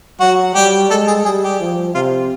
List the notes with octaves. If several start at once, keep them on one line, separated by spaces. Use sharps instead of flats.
F#3 F#4
G3 G4
G#3 A4
G#4
G3 G#4
G4
F3
C3 F4